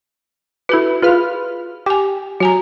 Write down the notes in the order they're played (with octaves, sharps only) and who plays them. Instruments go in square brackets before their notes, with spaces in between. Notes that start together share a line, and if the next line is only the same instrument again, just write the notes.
[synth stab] E4 B4 [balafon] F#4 A4
[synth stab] F4 B4 F6 [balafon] G#4
[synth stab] G4 [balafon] G5 G#5
[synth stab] F#3 [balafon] F#4 G#5 A#5